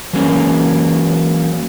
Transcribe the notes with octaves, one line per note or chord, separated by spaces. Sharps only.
E3 F#3 G#3 A#3 C#4